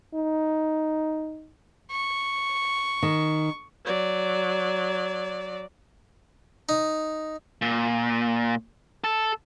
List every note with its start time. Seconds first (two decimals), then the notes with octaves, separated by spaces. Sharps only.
0.14 D#4
1.91 C#6
3.03 D#3
3.85 F#3 D5
6.69 D#4
7.62 A#2
9.04 A4